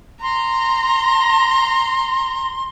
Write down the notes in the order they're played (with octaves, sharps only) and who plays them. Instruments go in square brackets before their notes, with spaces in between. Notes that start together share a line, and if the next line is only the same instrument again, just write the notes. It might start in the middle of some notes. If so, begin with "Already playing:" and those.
[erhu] A#5 [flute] C6